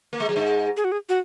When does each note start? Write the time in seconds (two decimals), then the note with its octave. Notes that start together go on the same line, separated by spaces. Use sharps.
0.13 A#3
0.20 G#3
0.29 F#3
0.36 G#2 G#3
0.77 G#4
0.84 F#4
0.92 G#4
1.09 F#4